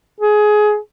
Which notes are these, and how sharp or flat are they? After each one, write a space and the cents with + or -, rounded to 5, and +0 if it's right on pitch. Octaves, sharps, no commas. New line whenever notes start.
G#4 +20